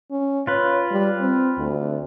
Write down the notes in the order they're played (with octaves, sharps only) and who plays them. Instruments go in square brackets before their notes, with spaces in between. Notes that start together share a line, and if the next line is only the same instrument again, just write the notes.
[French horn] C#4
[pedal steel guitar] F4 B4 [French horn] C#5
[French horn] G3
C4
D2